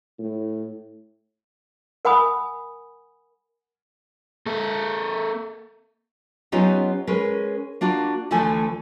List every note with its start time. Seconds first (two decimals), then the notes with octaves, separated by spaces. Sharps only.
0.18 A2
2.05 A#4 F#5 G#5 B5 D#6
4.46 A#3 A4
6.52 F#3 B3 C#4 D#4 F4 G4
7.07 G#3 C#4 A#4 B4
7.81 A#3 D4 F4 F#4
8.31 D2 E3 F3 A3 G#5